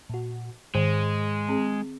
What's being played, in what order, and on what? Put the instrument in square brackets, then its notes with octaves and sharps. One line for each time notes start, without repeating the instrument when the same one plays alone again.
[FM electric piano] A#2 F#4
[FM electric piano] G#2 [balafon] D#3 [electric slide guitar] G#3
[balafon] C4 G#4